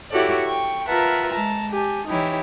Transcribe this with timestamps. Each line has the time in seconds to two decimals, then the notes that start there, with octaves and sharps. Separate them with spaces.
0.11 E4 F#4 G4 A4 C#5 D5
0.44 G5 C#6
0.87 F4 A#4 B4 E5 F#5 A5
1.29 G#3 A5 A#5
1.70 G4 G#5 A5
2.07 E3 D#4 E4 G4 C#5